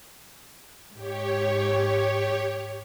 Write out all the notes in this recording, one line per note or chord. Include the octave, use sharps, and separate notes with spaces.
G#2 G4 C#5